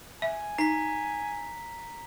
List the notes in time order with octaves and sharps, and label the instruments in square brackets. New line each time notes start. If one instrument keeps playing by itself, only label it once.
[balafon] E5 [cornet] G#5
[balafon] D#4 [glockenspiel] A#5 B6